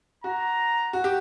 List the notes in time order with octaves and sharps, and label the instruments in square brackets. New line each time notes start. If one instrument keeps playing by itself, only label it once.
[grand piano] F#4 [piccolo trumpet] A#5
[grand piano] F#4
G4